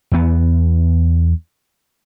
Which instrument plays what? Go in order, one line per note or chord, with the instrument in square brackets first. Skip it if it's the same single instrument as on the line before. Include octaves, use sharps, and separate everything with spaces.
[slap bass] E2 B3